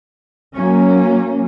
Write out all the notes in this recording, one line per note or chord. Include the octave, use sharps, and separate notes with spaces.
F#3 A#3 C#4